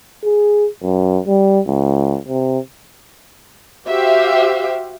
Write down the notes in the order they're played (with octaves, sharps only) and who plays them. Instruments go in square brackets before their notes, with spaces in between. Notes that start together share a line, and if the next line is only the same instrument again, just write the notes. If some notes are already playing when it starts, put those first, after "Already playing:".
[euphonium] G#4
F#2
G3
C#2
C3
[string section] F#4 G4 C5 E5 F5 G5